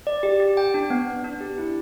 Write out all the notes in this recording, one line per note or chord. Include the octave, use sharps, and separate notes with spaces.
D5
G4
G4
G5
D4
B3
B3
D4
G4
E4